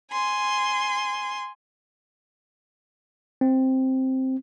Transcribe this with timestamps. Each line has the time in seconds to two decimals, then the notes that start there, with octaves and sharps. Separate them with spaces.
0.11 G#5 C6
3.41 C4